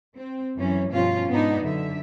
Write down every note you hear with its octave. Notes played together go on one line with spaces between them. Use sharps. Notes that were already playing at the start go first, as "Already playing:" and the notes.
C4
F#2 E3 C#4
G2 B2 F3 C#4 F4 F5
G#2 B3 D4 D#4
F#2 D3 E5